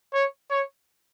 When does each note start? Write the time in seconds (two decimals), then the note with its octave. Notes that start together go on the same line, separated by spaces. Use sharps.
0.13 C#5
0.50 C#5